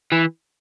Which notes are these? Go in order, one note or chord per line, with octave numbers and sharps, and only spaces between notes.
E3